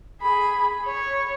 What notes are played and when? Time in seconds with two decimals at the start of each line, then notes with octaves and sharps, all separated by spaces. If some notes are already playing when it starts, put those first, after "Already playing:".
0.22 G#4 B5
0.86 C#5